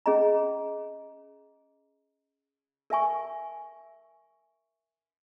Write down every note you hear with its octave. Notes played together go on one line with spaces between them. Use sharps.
C#4 G#4 D#5 A#5
A#4 E5 G#5 C#6